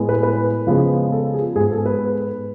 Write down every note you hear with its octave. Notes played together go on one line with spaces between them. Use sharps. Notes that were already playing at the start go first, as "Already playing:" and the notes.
Already playing: A2 G#3 B3
B4
B4
C#3 F3 G#3 B3
A4
G#4
G#2 G#3 B3 G#4
A4
B4